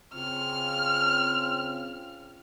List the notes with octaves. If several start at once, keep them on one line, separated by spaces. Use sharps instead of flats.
C#3 C4 F4 F6